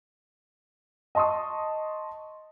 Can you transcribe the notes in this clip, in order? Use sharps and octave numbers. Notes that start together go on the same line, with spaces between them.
D#5 A5 C6 C#6 D#6